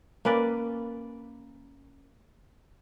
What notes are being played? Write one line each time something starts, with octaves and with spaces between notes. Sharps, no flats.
A#3 C#4 B4 D5